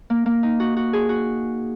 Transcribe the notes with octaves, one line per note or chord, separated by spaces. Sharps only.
A#3
A#3
D#4
F#4
F#4
G#4
F#4